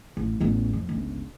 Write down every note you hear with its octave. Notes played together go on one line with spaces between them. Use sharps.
A1
A1 E2
F2
G1 C#2